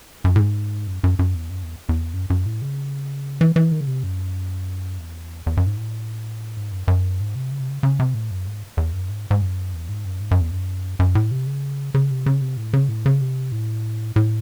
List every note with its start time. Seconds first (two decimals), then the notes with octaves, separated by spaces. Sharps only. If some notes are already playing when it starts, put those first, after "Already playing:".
0.24 F#2
0.36 A2
0.39 G#2
0.87 F#2
1.04 F#2
1.19 F#2
1.35 E2
1.50 F#2
1.63 E2
1.89 E2
2.14 F#2
2.30 F#2
2.46 A2
2.62 C#3
3.41 E3
3.56 E3
3.72 D#3
3.81 C#3
3.87 C3
4.03 F#2
4.99 E2
5.46 E2
5.57 F#2
5.67 G#2
5.77 A2
6.57 G#2
6.72 F#2
6.88 F#2
7.20 G#2
7.35 C3
7.51 C#3
7.60 C3
7.69 C#3
7.83 C#3
7.99 C3
8.14 A2
8.31 F#2
8.47 G#2
8.77 E2
8.93 F#2
9.09 G#2
9.31 G#2
9.42 F#2
9.73 E2
9.89 G#2
10.05 F#2
10.21 G#2
10.31 F#2
10.41 E2
10.51 F#2
10.99 F#2
11.15 A2
11.31 C3
11.47 C#3
11.94 C#3
12.11 C3
12.26 C#3
12.41 C3
12.57 A2
12.73 C#3
12.89 A2
13.06 C#3
13.21 C3
13.52 A2
14.16 A2